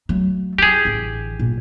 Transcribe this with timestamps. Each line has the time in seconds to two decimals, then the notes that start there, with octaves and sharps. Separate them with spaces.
0.09 F#3 A3
0.58 D#4 E4 G4 G#4
0.85 A1 D3
1.40 A#2